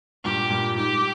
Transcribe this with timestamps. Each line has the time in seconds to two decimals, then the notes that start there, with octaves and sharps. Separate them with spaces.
0.24 G2 A#2 G4
0.50 G2 A#2
0.76 G#2 G4